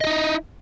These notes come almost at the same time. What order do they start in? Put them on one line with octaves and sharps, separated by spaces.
D#5 F#4 D#4 E4